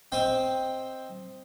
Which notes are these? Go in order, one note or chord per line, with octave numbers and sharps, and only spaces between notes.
C4 C5 D#5 G5